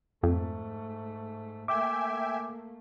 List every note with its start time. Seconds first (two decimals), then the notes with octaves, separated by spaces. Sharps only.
0.23 F2 G#2 A3
1.68 A3 A#3 E5 G5 G#5 D6